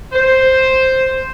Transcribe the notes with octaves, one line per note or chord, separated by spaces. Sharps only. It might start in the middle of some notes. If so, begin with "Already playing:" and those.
C5